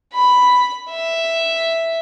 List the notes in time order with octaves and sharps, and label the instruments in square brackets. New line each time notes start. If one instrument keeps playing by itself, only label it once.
[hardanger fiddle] B5
E5